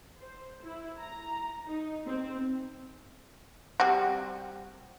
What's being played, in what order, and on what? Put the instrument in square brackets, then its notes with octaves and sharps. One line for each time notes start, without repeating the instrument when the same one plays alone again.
[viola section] C5
E4
A#5
D#4
C4
[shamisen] G3 C4 F#4